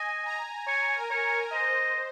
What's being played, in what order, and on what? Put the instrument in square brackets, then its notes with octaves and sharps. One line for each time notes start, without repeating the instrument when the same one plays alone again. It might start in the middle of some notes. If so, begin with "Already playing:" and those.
Already playing: [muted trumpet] D#5 [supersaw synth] G#5
[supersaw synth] A#5
[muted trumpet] C#5 [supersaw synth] G#5
[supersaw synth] A#4
[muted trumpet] C#5
[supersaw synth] A#4
[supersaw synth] C5 [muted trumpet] D#5